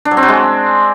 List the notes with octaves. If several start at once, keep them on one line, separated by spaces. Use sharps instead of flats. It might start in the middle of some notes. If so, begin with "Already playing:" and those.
D4
F#3
C4
F#3
G#3